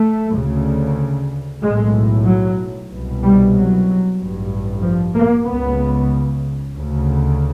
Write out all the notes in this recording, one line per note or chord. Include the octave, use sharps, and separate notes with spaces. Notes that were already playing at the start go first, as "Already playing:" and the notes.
Already playing: A3
D2 C#3
B1 A2 G#3
F#3
C2 B2
G3
F#3
A1 G2
F3
A#3
C#2 C#3 B3
D2 C#3